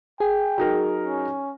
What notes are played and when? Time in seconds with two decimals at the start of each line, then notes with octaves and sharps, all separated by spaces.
0.20 G#4 G5
0.58 F#3 D#4 A#4
1.04 C#4